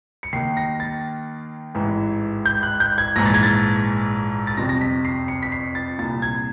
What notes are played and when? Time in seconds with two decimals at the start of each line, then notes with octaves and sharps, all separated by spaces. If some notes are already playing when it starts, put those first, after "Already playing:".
0.23 C#7
0.33 D#2 D#3 C7
0.57 A#6
0.80 A6
1.75 A1 G#2 E3
2.46 G6
2.63 F#6
2.80 G6
2.98 G#6
3.16 A#1 G#2 E3 A#6
3.25 A6
3.34 G#6
3.43 A6
4.47 A6
4.57 G1 F2 C3 A#6
4.69 A#6
4.81 B6
5.05 C7
5.28 C#7
5.43 B6
5.52 C7
5.75 A6
5.99 C2 A#2 A6
6.22 G#6